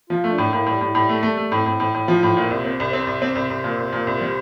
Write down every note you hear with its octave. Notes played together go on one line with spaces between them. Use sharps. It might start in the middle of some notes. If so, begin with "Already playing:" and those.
F3 F4
A3
D4
A2
A#3
A2
A2 G3
A2
A2 G3
A3
G3 A3
A3
A2 C4
A2
A2
A2
F3 C5
A2
A#2
C2
C4
C2
C4 C5
C2
C4
C2
C2
A#2
C2
A#2
C2
G3